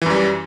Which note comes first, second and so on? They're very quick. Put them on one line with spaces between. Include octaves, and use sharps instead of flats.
E3 F#2 G3